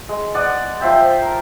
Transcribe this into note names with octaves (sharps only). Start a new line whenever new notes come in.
G#3
D5 F#5 D#6
F3 C5 E5 G5
A#4